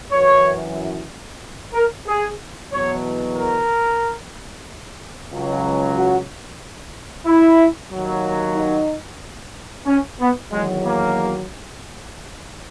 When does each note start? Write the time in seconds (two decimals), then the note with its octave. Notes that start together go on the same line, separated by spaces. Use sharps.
0.11 F#2 E3 C#5
1.74 A#4
2.06 G#4
2.71 E2 B2 F#3 C#5
3.37 A#4
5.31 C#2 C#3 F#3
5.97 F#4
7.26 E4
7.91 D#2 D#3 F#3
8.56 D#4
9.86 C#4
10.19 B3
10.51 E2 D#3 F#3 G#3
10.84 A#3